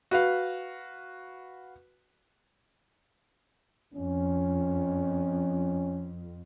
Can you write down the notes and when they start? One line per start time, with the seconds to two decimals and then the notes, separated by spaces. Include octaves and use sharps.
0.11 F#4 B4 F5
3.94 F2 C#4